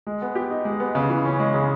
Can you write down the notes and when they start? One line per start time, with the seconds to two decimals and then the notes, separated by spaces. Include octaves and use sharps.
0.07 G#3
0.22 B3
0.35 G4
0.50 D#4
0.65 G#3
0.80 B3
0.95 C#3
1.10 E3
1.25 C#4
1.39 G#3
1.54 C#3